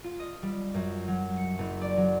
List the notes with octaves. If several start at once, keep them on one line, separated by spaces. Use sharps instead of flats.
F4
D#5
G3
F#2
F#3
C#7
F#1
D5
F#3